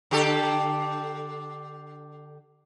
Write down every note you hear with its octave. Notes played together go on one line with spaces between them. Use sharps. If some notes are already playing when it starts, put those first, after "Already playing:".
D3 G4 A4